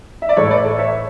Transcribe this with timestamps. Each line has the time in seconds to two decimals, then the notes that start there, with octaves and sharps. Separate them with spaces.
0.22 E5
0.29 D5
0.37 A2 E3 A4 C#5
0.50 B4 D5
0.65 A4 C#5
0.78 C#5 E5